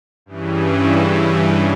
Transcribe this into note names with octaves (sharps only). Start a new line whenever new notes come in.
G2 C#3 E3